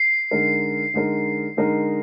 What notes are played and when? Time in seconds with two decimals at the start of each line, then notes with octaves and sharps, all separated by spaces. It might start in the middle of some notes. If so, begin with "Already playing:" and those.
Already playing: C7
0.31 D3 G#3 D#4 A#4
0.94 D3 G#3 D#4 A#4
1.57 D3 G#3 D#4 A#4